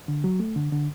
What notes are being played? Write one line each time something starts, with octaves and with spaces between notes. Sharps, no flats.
D3
F#3
A3
D3
D3